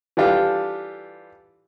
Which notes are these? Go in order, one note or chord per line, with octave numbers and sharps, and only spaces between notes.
E3 G3 D4 F4 G4 A4